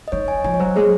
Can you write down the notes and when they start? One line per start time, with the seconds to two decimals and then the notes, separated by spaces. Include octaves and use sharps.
0.08 D#5
0.12 D#3 C#5
0.28 G#5
0.44 F3 G#5
0.54 C#5
0.60 F#3 C5
0.76 G#3 G#4